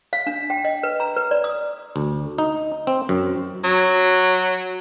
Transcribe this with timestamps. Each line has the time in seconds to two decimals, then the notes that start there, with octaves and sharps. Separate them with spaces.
0.13 F5
0.27 D4
0.50 G5
0.65 D#5
0.83 B4
1.00 A#5
1.16 B4
1.31 D5
1.44 D#6
1.96 D2
2.38 D#4
2.87 C4
3.09 F#2
3.64 F#3